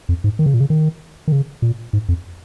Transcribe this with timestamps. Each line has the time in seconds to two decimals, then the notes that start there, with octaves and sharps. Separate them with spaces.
0.09 F2
0.24 G#2
0.39 D#3
0.46 C#3
0.54 A#2
0.60 C#3
0.70 D#3
1.28 D#3
1.32 C#3
1.62 A#2
1.93 G#2
2.09 F2